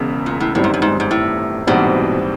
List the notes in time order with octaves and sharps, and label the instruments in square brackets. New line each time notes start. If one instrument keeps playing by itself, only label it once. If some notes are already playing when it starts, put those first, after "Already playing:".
Already playing: [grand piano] E1 E2 C#3
[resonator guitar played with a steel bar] A#2
A2
[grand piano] G1 F#2 D#3 G3 C4 [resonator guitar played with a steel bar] A2
[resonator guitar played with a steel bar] G#2
G2
G#2
G#2
A2
[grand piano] A#1 G#2 E3 G3 C4 [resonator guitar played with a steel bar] B2